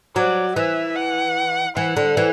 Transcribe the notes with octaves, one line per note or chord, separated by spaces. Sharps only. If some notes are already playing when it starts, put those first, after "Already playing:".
F#3 D5
E3 E5
F#5
E3 F#5
D3
E3